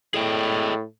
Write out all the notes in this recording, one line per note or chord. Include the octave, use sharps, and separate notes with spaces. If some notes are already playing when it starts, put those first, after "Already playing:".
A2 G#4 D#5 G5